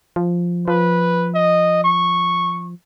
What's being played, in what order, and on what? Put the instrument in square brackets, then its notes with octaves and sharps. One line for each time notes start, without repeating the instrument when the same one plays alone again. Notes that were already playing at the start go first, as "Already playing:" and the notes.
[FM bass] F3
[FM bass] F3 [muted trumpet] B4
[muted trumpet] D#5
C#6